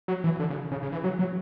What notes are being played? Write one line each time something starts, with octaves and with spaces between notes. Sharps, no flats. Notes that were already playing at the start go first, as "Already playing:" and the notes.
F#3
E3
D3
C#3
C#3
C#3
E3
F#3
F#3